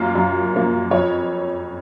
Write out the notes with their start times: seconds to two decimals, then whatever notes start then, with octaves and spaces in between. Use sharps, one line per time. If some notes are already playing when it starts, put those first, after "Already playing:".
Already playing: F#2 F3 A#3 F5
0.15 F#2
0.54 F3 A#3
0.91 F2 C#5